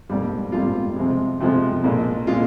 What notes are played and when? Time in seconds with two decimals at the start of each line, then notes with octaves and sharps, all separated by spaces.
0.10 A#1 G#2 G3
0.52 A#1 G#2 G3 F4
0.96 F2 C3 F3 G#3
1.40 F2 C3 F3 G#3
1.83 A#1 A#2 G#3
2.27 A#2 G#3 F4